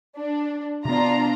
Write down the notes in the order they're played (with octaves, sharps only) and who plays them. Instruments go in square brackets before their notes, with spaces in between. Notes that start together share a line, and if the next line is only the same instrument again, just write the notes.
[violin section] D4
[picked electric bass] C3 B3 [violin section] D4 F4 A#5